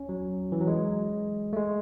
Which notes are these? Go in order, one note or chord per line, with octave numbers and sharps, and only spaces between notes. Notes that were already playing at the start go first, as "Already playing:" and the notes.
Already playing: C#4
F#3
E3
F#3
G#3
A3
G#3